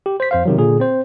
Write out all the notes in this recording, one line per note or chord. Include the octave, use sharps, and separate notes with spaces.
G4
C5 B6
F2 C5 F5
C3 D#3 F#3
A#2 D3 G#4
C4 C5